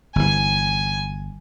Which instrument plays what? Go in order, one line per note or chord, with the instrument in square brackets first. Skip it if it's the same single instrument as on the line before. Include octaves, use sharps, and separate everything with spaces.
[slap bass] G1 E3 [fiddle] G#5